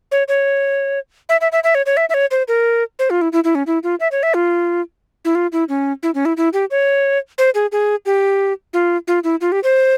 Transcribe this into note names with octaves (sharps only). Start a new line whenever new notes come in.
C#5
C#5
E5
E5
E5
E5
C#5
C#5
E5
E5
C#5
C5
A#4
C5
F4
E4
E4
E4
C#4
E4
F4
E5
C#5
E5
F4
E4
F4
E4
C#4
E4
C#4
E4
E4
G4
C#5
C5
G#4
G#4
G4
F4
F4
E4
F4
G4
C5